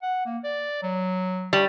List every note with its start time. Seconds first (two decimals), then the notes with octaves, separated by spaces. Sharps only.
0.02 F#5
0.26 A#3
0.44 D5
0.82 F#3
1.53 G3